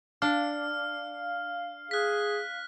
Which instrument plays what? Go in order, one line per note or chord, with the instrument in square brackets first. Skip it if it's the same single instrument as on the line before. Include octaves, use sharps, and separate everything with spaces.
[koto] D4 [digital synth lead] F5 [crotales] F6
[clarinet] G#4 [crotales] F#6 B6